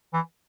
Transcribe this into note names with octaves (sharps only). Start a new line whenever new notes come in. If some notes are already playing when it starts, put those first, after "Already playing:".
E3